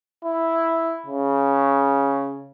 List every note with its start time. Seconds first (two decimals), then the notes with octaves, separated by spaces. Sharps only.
0.24 E4
1.06 C#3